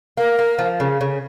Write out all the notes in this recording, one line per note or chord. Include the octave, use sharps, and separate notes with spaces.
A#3 A#4
A#3
F3
C#3
C#3